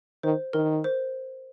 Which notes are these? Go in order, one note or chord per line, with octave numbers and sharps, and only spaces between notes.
D#3 C5
D#3 A#4
C5